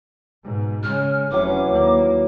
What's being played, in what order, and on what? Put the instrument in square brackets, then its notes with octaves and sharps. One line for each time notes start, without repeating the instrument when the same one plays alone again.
[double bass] G#2 B2
[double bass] C#3 G#3 [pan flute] F6
[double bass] F1 C#4 [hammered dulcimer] E3 F#3 [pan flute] D6
[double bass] D#2 A#3